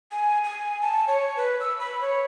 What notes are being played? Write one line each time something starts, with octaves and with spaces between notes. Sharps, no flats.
G#5
G#5
A5
C#5
B4
E6
B5
C#5